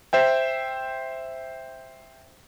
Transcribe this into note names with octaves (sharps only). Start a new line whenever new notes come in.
C5 E5 G5